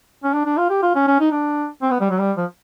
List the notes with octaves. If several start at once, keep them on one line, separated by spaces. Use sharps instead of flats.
C#4
D4
D4
F4
G4
F4
C#4
C#4
D#4
D4
C4
B3
G3
F#3
G3
F3